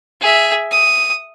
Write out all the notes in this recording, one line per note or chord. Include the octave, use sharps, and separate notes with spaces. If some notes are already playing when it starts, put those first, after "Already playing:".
G#4 E5
D#6